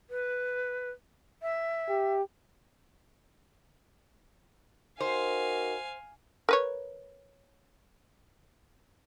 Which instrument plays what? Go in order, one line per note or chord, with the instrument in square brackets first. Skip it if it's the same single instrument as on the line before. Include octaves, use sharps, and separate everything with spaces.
[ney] B4
E5
[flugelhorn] G4
[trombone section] D#4 F#4 A#4 [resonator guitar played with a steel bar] C5 [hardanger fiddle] F5 G#5
[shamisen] A#4 B4 C#5